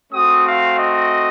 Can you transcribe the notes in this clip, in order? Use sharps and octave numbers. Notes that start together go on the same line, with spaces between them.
A3 C4 F#4 D#6
F5
D#5